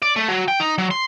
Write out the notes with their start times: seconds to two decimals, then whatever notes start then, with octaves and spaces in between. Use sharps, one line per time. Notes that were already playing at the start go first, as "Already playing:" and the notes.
0.02 D5
0.16 A3
0.28 F#3
0.48 G5
0.60 D#4
0.78 F#3
0.91 C6